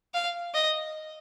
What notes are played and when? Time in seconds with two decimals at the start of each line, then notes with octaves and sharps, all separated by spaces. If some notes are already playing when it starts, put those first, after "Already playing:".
0.14 F5
0.54 D#5